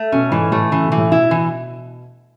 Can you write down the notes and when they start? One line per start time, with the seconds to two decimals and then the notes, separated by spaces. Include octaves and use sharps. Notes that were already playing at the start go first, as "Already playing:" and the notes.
Already playing: A3
0.12 B2 C#4
0.31 G#2 E3
0.51 A2 A3
0.72 C#3 E3
0.85 B2
0.92 E3
0.98 A2
1.10 B2 E4
1.31 E3